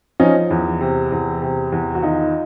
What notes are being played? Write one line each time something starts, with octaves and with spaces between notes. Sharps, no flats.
F3 C#4 D#4
E2
C3
E2
C3
E2
F#4
D#3 D#4 F4